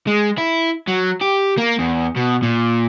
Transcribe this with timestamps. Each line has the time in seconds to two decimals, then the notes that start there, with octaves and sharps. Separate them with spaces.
0.07 G#3
0.38 E4
0.88 F#3
1.21 G4
1.58 A#3
1.79 E2
2.17 B2
2.43 A#2